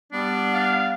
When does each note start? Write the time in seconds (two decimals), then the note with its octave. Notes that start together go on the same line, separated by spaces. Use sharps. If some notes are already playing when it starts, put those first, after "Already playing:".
0.12 G3 B3 D4
0.54 F5